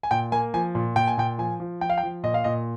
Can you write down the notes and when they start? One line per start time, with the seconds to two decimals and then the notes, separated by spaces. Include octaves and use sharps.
0.03 G#5
0.11 A#2 G5
0.32 A#3 G#5
0.54 F3 G#5
0.75 A#2
0.96 A#2 G5
1.07 G#5
1.18 A#2 G5
1.38 F3 G#5
1.60 F3
1.81 F3 G5
1.90 F5
1.98 G5
2.03 F3
2.23 A#2 D#5
2.34 F5
2.44 A#2 D#5